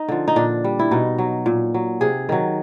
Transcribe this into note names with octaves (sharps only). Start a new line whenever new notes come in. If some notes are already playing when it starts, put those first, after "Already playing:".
Already playing: D#4
D3 F3
D#4
A#2 D4
G3
E4
B2 D#4
F#3
A#2
F#3
C3 G#4
D#3 F#3